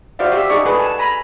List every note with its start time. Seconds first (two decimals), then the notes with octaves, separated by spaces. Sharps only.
0.19 F#4 C5 D5 E5 F5
0.32 G4 E5
0.50 D#4 G#4 D5 C#6
0.66 G#4 A4 B4 F#5
0.79 G#5 A5
0.98 G#5 A#5 B5